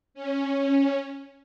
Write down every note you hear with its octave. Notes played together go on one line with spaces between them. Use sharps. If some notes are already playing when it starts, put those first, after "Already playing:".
C#4